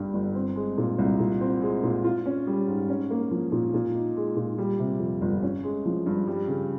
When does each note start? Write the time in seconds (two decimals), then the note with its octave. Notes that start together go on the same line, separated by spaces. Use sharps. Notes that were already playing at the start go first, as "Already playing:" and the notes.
Already playing: G1 G2 G3
0.14 G1
0.35 C4
0.56 G#3
0.78 A#2
0.99 C2
1.19 A#2
1.41 C4
1.62 G#3
1.83 A#2
2.04 F4
2.26 C#4
2.47 G3
2.67 G#2
2.89 C#4
3.10 A#3
3.31 F3
3.52 A#2
3.74 A#2
3.95 D#4
4.16 G#3
4.36 A#2
4.58 G3
4.79 C3
5.00 F2
5.21 G1
5.42 C#4
5.63 G#3
5.85 F3
6.06 G2
6.27 G3
6.48 C#3